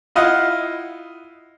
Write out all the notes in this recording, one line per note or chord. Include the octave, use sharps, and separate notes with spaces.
E4 F4 D#5 F5 F#5